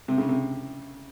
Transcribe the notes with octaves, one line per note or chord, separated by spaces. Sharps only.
C3
C#3
C3